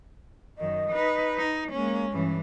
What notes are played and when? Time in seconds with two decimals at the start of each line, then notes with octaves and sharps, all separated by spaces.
0.58 F#2 D#3 D#5
0.91 D#4 B4
1.38 D#4
1.72 G#3 A#3 C#4
2.11 G2 E3 C#4